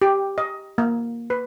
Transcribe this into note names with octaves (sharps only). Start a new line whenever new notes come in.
G4
D#5
A#3
B4